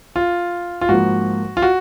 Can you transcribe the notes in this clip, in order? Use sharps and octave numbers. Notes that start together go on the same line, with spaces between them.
F4
F4
G#2 F3 A#3 F#4
F4
F#4